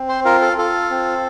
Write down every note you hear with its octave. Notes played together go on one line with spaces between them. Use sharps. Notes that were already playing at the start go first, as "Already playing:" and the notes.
Already playing: C4
C5
F4 A#4
A4
F4 A4
C4